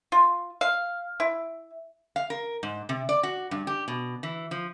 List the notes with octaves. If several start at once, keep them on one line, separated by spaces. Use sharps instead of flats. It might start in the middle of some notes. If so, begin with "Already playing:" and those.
F4
F5
E4
F5
A#4
G#2
C3
D5
F#4
G2
G4
B2
E3
F3